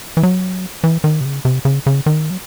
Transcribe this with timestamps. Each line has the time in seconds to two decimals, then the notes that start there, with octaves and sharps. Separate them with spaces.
0.17 E3
0.23 F#3
0.84 E3
1.04 D#3
1.21 C3
1.25 C#3
1.45 C3
1.65 C#3
1.86 C#3
2.06 D#3
2.30 F#3